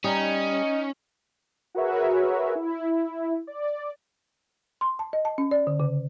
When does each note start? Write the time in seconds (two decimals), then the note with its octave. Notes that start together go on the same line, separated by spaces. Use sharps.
0.04 G3 C#4 D#4
1.75 F#4 G#4 A#4 B4 C#5 E5
2.55 E4
3.47 D5
4.81 C6
4.99 A5
5.13 D#5
5.25 A5
5.38 C#4
5.51 D5
5.67 D3
5.80 C#3